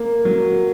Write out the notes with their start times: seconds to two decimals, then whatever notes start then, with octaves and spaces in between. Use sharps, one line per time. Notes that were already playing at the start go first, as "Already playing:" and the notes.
Already playing: A#3
0.25 F#3